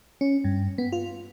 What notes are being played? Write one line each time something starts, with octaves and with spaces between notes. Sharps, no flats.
C#4
G2
B3
F4